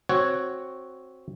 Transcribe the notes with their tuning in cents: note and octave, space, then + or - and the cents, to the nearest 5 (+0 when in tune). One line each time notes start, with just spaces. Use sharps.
C4 +10 F#4 +0 C#5 +0